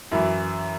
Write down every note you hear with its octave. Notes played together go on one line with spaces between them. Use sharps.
F#2 E3 E4